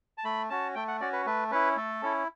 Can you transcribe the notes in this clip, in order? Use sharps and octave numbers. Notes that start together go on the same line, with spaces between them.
A5
A3 B5
C#4 F#4 A5
A3 G5
F#5
C#4 F#4 D5
B4
A3 B4
C#4 E4 B4
A3 A4
C#4 E4